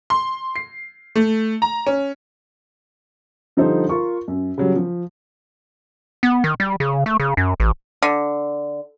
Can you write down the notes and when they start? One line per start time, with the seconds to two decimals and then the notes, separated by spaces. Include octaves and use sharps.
0.10 C6
0.56 C7
1.16 A3
1.62 A#5
1.87 C#4
3.57 D3 F3 G3 D#4 A4 C5
3.89 F4 A#4 C#6
4.28 F#2
4.58 C#3 F#3 G3
4.76 F3
6.23 B3
6.44 D#3
6.60 G3
6.80 C#3
7.06 A3
7.20 C#3
7.37 F#2
7.60 A1
8.03 D3